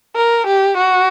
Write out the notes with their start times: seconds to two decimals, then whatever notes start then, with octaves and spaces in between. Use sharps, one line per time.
0.16 A#4
0.47 G4
0.77 F#4